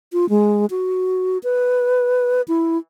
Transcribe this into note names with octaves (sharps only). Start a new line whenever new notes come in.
F4
G#3
F#4
B4
E4